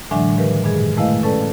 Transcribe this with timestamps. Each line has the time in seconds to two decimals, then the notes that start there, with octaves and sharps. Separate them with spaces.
0.11 A2 D3 E3 F#3 G#3 D4
0.37 D#3 F3 G4 A#4 B4
0.63 G2 A#2 D#3 G#3 G#4
0.97 G#3 A3 E4 B4 D#5 F5
1.23 C#4 A4 B4 D5 A5